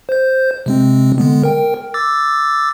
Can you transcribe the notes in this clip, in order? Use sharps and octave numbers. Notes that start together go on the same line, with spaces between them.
C5 G6
C3 G#3 C4
D3 G#3 B3
A#4 G5
D6 E6 A6